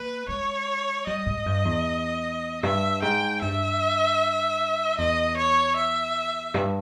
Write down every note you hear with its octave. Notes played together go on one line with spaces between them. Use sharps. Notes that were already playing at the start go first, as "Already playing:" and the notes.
Already playing: A#3 B4
G#3 C#5
G3 D#5
G#2
G2
E2
G2 E5
G#2 G5
G2 E5
E2 D#5
C#5
E5
G2